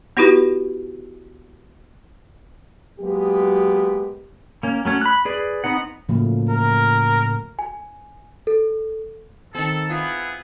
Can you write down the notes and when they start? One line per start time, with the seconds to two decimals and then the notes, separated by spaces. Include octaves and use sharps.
0.17 B3 D#4 E4 F#4 G4 B4
3.00 F#3 G#3 A#3 B3 G4
4.63 A#3 C#4
4.85 F#3 A3 C#4
5.01 B5 F#6
5.25 G#4 B4 D5
5.64 B3 C4 D#4 F#5
6.09 A2 C#3 F3 F#3 A3 A#3
6.50 A#4
7.59 G#5
8.47 A4
9.55 D#3 C4 A4
9.90 B3 E4 F4 G#4